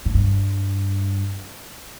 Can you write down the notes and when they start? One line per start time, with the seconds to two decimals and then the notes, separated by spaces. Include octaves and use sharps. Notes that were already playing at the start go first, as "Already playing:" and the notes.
0.06 A2
0.14 G2